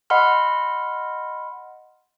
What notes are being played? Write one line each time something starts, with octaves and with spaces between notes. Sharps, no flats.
D#5 F#5 B5 C6 F6